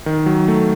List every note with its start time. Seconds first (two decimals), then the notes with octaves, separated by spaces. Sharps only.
0.06 D#3
0.26 F#3
0.48 A3